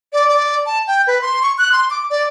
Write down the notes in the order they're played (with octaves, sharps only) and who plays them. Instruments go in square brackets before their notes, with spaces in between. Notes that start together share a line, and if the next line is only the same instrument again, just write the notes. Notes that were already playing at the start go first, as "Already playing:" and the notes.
[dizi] D5
D5
A5
G5
B4
C6
C#6
F#6
C6
D6
D5